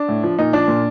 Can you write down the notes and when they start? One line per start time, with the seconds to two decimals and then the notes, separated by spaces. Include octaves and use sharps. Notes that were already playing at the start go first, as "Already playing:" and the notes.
Already playing: D4
0.08 A2
0.23 F3
0.39 A#2 D#4
0.53 F3 D4
0.68 A#2